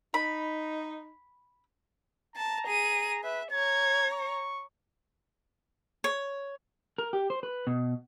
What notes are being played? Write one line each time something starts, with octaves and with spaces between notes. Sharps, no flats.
D#4 B5
A5 A#5
G#4 D#7
B4 E5
C#5 A#5 G#6
C#6
C#5
A#4
G4
C5
B4
B2